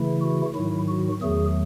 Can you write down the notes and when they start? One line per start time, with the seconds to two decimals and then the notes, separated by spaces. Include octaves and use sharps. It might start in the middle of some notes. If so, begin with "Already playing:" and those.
Already playing: C#3 E3 A3 E4
0.22 F#4
0.55 G#2 D#3 F#3 E4
0.88 F#4
1.21 E2 D#3 F#3 A3 G#4